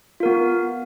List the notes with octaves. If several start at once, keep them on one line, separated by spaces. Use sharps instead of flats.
B3 F4 A#4